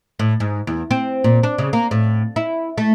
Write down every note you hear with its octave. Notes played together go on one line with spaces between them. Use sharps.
A2
G#2
E2
C4
A#2
D4
C#3
A#3
A2
E4
A3